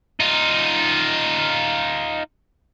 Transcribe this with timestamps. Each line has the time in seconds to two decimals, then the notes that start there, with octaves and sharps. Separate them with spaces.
0.20 D#4 F4